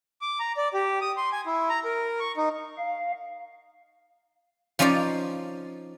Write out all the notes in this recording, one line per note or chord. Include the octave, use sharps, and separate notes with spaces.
D6
A#5
D5
G4
D#6
C6
G#5
E4
A#5
A#4
C#6
D#4
F5
F3 C#4 D#4 F4 D5